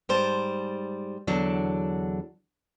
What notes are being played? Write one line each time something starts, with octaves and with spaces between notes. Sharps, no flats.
G#2 G3 C5 A5
E2 D3 F#3 D4